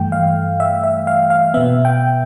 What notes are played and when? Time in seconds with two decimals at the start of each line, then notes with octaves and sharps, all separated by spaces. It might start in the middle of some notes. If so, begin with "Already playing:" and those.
Already playing: G2 E3 A3 G5
0.12 F5
0.60 E5
0.84 E5
1.07 F5
1.30 F5
1.54 B2 B3 E5
1.85 G5